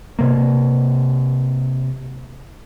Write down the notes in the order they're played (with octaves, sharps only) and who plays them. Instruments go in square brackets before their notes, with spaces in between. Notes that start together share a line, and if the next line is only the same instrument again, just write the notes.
[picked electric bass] C3 A#3